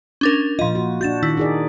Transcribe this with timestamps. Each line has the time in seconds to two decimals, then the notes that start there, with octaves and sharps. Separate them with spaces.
0.21 C#4 D4 A#4
0.59 A#2 F3 F4 D#5
0.75 F#4
1.01 D4 F#4 G6 A6 E7
1.23 D#3 E4
1.37 D#4 G#4 D5